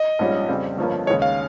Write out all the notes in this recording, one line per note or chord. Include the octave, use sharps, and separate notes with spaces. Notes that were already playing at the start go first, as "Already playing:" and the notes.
Already playing: D#5
A#1 G#2 G3 C#4 F4
F2 C#3 G3 C4
G1 G2 F3 A#3 C#4
D#2 C#3 G#3 C#5
F5